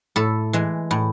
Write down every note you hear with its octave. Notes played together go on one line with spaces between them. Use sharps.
A2 A4
E3 G#3
A2